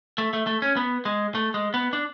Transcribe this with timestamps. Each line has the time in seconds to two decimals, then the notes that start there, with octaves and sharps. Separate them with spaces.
0.18 A3
0.33 A3
0.47 A3
0.62 C#4
0.76 B3
1.05 G#3
1.35 A3
1.54 G#3
1.74 B3
1.93 D4